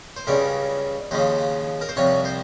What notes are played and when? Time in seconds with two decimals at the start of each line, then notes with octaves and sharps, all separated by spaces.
0.16 C5
0.27 C#2 C#3 G3 A#4
1.11 D#2 C#3 F3 C5
1.81 A#4
1.89 C5
1.96 C2 C3 F3 C#5
2.25 C5